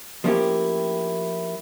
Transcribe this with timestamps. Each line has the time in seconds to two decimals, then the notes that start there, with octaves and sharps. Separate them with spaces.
0.24 F3 A3 A#3 C#4 E4 G4